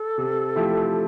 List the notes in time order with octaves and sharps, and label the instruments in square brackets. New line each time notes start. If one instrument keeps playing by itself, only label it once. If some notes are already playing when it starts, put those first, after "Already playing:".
Already playing: [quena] A4
[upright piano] C3
F3 A3 E4 G4